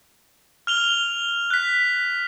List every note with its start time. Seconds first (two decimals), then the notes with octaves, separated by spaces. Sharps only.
0.67 F6 F7 G7
1.50 F#6 B6